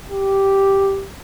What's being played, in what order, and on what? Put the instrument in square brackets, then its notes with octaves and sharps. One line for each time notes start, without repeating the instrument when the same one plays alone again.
[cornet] G4